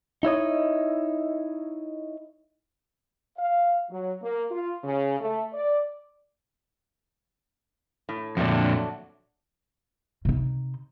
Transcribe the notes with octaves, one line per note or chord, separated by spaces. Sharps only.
D#4 E4 C#5 D#5
F5
F#3
A#3
F4
C#3
A3
D5
A2
F2 A#2 F#3 A3 D4
C3 D#4